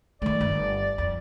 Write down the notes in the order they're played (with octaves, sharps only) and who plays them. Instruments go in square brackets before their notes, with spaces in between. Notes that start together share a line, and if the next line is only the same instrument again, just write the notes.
[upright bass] D#3 A3 [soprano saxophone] D5
[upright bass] G1
F2